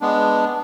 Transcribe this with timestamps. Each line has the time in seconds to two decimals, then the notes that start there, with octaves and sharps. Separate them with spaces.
0.01 G#3 B3 D4